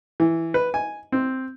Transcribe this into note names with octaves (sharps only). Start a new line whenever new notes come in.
E3
B4
G#5
C4